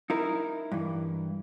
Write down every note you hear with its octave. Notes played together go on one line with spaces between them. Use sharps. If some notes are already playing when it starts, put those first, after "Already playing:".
D#4 E4 A#4
G2 E3